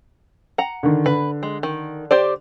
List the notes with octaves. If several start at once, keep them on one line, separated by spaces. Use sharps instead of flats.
F#5 A#5
D3 D#3
D3 B4
G#3
D#3
G4 C5 D5